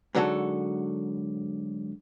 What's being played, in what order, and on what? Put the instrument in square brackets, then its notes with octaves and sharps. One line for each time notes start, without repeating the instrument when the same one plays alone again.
[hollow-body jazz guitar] G#2 D3 F#3 F#4 A4